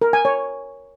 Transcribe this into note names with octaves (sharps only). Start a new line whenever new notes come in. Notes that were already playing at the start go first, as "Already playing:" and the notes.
A#4
G#5
C#5